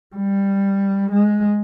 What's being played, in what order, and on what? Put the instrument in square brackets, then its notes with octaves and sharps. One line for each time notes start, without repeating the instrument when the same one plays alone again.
[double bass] G3
G#3